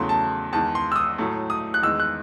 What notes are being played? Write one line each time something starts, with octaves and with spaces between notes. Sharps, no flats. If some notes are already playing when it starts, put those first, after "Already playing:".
Already playing: E2 C#3 F#3 A3 C6
A5
E2 D#3 G#3 A5
C6
E6
D#6
A2 F#3 A3
D#6
F#6
E2 D#3 G#3 E6
F#6